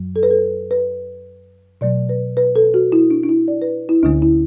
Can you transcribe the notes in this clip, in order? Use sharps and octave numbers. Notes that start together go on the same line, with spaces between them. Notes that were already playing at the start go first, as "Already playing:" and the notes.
Already playing: F#2 F#3
A4
B4
A4
B4
B2 F#3 A3 D5
B4
B4
A4
F#4
E4
D4
D4
E4
D5
B4
E4
D2 D3 A3 D4
E4